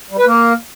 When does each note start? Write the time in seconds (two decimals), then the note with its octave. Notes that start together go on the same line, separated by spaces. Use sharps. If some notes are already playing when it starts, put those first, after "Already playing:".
0.11 G3
0.18 B4
0.26 A#3